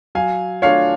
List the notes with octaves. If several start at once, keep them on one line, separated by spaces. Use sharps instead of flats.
F#3 F5 G#5
A3 D4 F4 C#5 F5